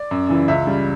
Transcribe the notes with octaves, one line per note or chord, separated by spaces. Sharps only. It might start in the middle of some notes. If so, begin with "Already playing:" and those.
Already playing: D5
F#2
C#3 E3
C#2 E5
C#3 G3